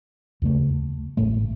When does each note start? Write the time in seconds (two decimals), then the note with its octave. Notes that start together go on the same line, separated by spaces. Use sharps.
0.42 D#2 C#3 A3
1.17 A1 A2 A3